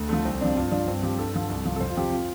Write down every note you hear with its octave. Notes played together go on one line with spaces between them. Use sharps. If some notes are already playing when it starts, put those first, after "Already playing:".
Already playing: D2
D3 F3 A3
C2 C4
C3 F3 D4
G2 F4
F3 D4
G2 C4
F3 G4
G2 A4
D3 F3
C2
C3 F3
A4
F2 C5
F4
C3 F3 G4
F4